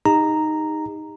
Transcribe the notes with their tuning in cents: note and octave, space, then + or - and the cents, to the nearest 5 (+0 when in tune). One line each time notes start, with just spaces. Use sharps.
D#4 +0 G4 +45 A#5 -5